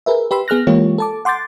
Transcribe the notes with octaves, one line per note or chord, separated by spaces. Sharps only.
G#4 A#4 B4 E5
G4 B4 B5 C6 E6
B3 G#4 F6 F#6 A#6
E3 G#3 A#3 F4 G4 C#5
A4 A5 D6
F#5 C6 D6 G6 A6